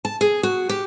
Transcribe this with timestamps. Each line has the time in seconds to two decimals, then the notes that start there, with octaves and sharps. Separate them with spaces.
0.05 A5
0.21 G#4
0.43 F#4
0.69 G4